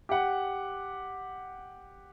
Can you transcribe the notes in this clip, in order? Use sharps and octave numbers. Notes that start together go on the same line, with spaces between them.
G4 F#5